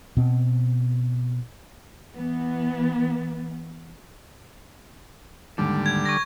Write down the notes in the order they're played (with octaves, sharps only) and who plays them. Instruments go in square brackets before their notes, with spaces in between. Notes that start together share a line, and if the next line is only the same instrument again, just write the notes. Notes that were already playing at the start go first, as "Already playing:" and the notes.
[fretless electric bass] B2 C4
[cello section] E3 B3
[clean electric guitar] D#2 G#2 [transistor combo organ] D3 G3
[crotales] G#6
C#6 A#6